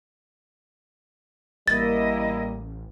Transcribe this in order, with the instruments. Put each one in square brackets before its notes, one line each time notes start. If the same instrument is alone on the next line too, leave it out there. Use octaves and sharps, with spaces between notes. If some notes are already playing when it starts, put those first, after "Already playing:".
[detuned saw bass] A1 [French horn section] G3 A#3 [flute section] E4 D#5 [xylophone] A6